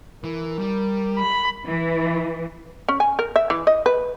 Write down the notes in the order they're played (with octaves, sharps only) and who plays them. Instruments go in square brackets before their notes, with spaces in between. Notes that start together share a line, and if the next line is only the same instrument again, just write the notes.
[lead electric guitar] E3 [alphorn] A#4
[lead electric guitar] G3
[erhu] B5
[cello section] E3
[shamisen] C#4
G#5
A#4
E5
E3
D#5
B4